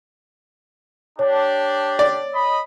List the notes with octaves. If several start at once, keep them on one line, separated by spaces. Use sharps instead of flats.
D4 G4 C#5
D5
D#5 B5